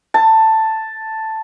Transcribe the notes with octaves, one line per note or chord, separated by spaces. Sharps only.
A5